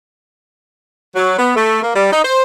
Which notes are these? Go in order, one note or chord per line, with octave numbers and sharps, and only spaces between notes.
F#3
B3
A3
A#3
G3
D#4
C5